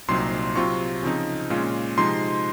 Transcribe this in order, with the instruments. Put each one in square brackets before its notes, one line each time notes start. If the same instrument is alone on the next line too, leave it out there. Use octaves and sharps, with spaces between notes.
[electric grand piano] C2 A#2 F#3 C4 D#4 C6
C3 F#3 C4 F4 C#6
C#3 F3 C4 D#4
A#2 G#3 C#4 F4
C3 F3 G#3 D#4 C6